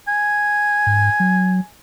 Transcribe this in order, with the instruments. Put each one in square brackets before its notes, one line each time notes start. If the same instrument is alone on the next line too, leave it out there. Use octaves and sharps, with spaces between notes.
[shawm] G#5
[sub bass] G#2
F#3